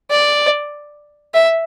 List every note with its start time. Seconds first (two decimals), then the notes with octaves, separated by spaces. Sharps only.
0.11 D5
1.34 E5